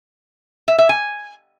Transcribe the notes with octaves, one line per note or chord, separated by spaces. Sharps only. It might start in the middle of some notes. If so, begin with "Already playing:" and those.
E5
E5
G#5